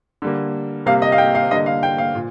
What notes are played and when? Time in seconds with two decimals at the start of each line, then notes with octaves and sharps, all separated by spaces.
0.22 D3 G3 A#3
0.86 C3 G3 A#3 F5
1.02 D#5
1.12 F5
1.18 G5
1.35 F5
1.51 D3 G3 A#3 D#5
1.66 F5
1.83 G5
1.98 F5
2.15 A#2